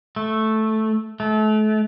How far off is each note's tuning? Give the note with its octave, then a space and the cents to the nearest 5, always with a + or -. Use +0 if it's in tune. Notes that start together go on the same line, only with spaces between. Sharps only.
A3 -5
A3 -35